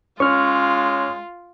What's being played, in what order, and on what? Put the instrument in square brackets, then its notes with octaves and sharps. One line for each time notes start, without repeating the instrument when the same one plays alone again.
[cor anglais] G#3 [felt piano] C#4 [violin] F4 [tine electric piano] C#6 F6